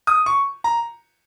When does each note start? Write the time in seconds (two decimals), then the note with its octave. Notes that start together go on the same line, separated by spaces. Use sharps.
0.07 D#6
0.26 C#6
0.64 A#5